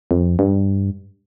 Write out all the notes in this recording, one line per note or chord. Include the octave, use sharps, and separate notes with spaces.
F2
G2